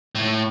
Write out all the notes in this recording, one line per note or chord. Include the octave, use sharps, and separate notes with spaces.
A2